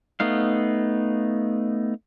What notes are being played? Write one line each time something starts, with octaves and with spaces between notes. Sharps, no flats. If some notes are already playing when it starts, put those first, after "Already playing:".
A3 B3 D#4 F5